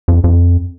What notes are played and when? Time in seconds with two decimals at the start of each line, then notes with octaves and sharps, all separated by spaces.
0.08 F2
0.24 F2